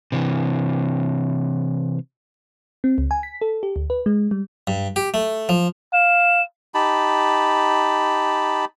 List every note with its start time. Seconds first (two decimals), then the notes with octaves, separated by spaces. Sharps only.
0.12 C3 E3
2.84 C4
2.98 C#2
3.11 G#5
3.23 B6
3.42 A4
3.63 G4
3.76 D2
3.90 B4
4.06 G#3
4.31 G3
4.67 G2
4.96 G4
5.14 A3
5.49 F3
5.93 F5 E7
6.74 D#4 G4 A5 B5